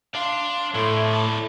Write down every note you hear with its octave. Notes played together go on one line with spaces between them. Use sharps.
D4 F5 C6
A2 A3 E4 D5 C6
A5